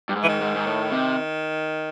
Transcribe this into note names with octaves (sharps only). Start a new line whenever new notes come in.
G2
G#2
E3
D#3
G#2
G#2
A2
C3